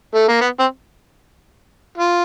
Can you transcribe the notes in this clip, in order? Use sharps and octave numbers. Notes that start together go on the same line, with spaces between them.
A3
A#3
B3
C4
F4